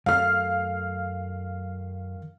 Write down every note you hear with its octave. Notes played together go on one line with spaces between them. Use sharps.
F#2 D#3 A3 F5 F6